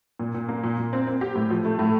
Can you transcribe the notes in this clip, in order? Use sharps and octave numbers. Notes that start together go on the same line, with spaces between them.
A#2
A#2
A#3
A#2
A#2
C4
C4
G4
A2
F3
A3
A2